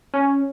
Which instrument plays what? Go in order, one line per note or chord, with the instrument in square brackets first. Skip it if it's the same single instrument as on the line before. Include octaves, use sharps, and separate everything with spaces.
[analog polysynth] C#4